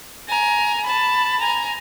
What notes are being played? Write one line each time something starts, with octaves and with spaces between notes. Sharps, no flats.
G#5 A#5
A5 B5
G#5 A#5